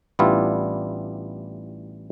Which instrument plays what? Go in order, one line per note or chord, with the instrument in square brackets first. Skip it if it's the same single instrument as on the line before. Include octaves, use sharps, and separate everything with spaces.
[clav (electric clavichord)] A1 G3 B3 D4 E4 F4